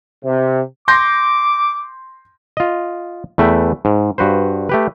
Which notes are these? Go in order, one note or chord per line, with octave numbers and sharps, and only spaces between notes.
C3
C6 D6 G6 A#6
F4 D#5
E2 A3 B4 E5 G5
G#2
G2 F#4 B4 C5
A3 G4 B4